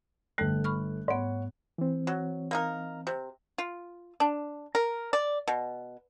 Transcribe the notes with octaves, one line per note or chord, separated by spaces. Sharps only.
G1 G3 A3 A4 F#6
B5 C#6 F6
G#2 B3 C#5 F#5
E3 C4
F#3
A#3 D#4 A#4
C3
F4
D4
A#4
D5
B2